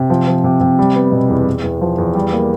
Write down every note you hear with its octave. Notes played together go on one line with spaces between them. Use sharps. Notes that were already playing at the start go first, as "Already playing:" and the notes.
Already playing: C3
F3
F3
C3
C3
G3
B3
B2
E2
E2
E2
F3
E2
G3
A#3